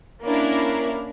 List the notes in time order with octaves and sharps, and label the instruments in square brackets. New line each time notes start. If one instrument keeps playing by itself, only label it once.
[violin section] A#3 C#4 D4 E4 A#4